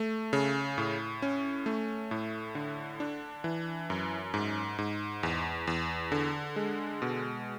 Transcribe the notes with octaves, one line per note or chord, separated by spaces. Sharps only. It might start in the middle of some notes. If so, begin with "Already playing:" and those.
Already playing: A3
C#3
A2
C#4
A3
A2
D3
D4
E3
F#2
G#2
G#2
E2
E2
D3
G#3
B2